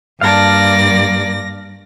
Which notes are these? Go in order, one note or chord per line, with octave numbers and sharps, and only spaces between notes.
G2 A#3 D5 F5 A5 A#6